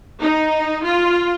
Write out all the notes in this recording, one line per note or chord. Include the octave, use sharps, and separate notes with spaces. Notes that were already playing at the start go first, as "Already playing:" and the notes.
D#4
F4